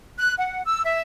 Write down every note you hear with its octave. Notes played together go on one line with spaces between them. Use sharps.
F#6
F#5
E6
E5